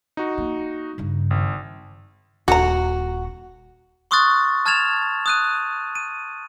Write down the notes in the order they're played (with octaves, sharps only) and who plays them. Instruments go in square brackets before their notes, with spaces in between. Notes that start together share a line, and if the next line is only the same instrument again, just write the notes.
[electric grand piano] D#4 F#4
[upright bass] A#3
G2 C#3
[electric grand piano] G#1
[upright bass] D#1 [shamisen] D3 A#5 [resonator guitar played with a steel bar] F#4
[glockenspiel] C6 C#6 D#6 F6 F#6 A6
A5 F6 G#6 A6 E7 F7
D#6 F#6 D#7
D#7